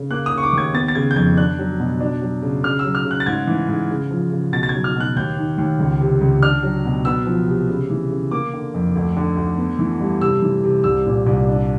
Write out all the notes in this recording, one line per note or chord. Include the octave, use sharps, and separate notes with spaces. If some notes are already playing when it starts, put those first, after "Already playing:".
Already playing: C#3
A#3 F#6
D#6
C#3
C#6
D6
D#2 G#6
B3 A6
A6
C#3 G#6
G6
F2 G#6
D4 F#6
F#3
B2
D4
F#3
C#3
C#3 F6
E6
F#3
F6
C#3
F#6
A6
G#2 G#6
E3
G#2
C#3
F3
C#3
B2 A6
A6
F#3 G#6
F6
B2 F#6
D#2 G6
D#3
D#2
C#2
C3
C#2
D4 F6
F#3
B2
B3 E6
F3
C3
C#3
E3
C#3
A#3 D6
D3
F2
D2
D3
D2
B3
E3
G2
C3 E6
E3
C3
C2 E6
A#2
C2
D4